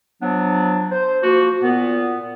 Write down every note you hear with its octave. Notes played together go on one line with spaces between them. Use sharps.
F3 F#3 B3 D4
C5
F3 A#3 F#4
A#2 B3